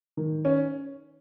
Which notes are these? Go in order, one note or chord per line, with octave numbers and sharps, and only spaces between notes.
D#3
C#4